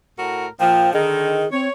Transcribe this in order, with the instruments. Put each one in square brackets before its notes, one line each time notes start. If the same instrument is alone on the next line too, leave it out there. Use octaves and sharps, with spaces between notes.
[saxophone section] A2 F#4 A#4
[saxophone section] A#2 F3 [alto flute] G5
[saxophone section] D3 D#3 [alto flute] G#4
[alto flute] C4 [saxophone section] C#5